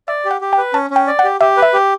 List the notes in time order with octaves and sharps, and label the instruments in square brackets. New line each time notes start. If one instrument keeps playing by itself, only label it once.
[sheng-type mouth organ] D5 [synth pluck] E5
[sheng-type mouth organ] G4
[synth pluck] F#5
[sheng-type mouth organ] G4
[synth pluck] G5
[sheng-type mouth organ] B4
[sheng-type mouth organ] C#4 [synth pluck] A5
[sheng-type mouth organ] C#4
[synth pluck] G5
[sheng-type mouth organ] D5
[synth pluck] F#5
[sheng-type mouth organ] G4
[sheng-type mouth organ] G4 [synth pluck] E5
[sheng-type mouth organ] B4
[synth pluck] E5
[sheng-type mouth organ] G4